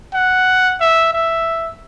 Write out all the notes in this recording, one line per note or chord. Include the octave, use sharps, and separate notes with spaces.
F#5
E5
E5